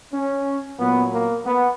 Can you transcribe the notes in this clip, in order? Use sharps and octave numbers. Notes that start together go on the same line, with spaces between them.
C#4
A#2 F#3 B3
A#3
B3